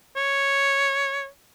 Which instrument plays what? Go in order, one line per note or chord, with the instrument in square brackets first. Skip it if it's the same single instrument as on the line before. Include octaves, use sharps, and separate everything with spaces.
[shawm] C#5